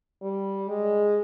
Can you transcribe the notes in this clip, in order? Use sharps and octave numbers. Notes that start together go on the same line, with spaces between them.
G3
G#3